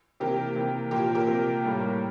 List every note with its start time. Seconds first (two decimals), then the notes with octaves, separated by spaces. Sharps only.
0.20 C3 E3 A#3 G4 A#4
0.56 C3 E3 A#3
0.91 A#2 F3 A#3 G4 A#4
1.15 G4 A#4
1.27 C3 F3 A#3
1.63 A2 G3 A#3